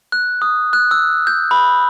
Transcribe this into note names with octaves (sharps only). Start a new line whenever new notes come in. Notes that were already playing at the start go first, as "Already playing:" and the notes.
F#6
D#6
F#6
E6
G6
B5